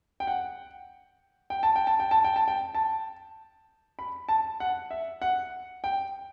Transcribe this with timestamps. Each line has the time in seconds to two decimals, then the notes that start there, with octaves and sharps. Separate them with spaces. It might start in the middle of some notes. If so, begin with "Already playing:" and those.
0.20 G5
0.27 F#5
1.50 G5
1.63 A5
1.76 G5
1.87 A5
2.00 G5
2.11 A5
2.24 G5
2.36 A5
2.48 G5
2.75 A5
3.99 B5
4.29 A5
4.60 F#5
4.91 E5
5.22 F#5
5.84 G5